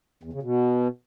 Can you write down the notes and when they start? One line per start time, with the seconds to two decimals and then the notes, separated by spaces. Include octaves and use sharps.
0.23 E2
0.33 C#3
0.42 B2